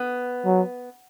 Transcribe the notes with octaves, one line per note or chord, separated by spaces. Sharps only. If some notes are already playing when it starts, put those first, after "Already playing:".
Already playing: B3
F#3